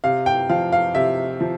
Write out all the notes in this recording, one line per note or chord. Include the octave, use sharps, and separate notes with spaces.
C3 F5
G5
F3 F5
F5
C3 E5
F3